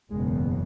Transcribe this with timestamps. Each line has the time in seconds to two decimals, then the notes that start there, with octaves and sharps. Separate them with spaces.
0.11 F#1 E2 B2 G#3